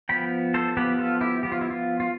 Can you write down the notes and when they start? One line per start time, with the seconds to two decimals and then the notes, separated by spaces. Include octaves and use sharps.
0.09 F3 B3 G5 B5
0.54 A4 C5
0.77 F3 B3 G4 B4
0.99 F4 A4
1.21 E4 G4
1.43 F3 B3 G4
1.52 F4
1.61 E4
1.70 F4
2.00 F4